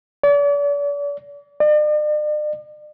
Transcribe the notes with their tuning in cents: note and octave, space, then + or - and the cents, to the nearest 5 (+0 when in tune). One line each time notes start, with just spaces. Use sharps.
D5 -40
D5 +45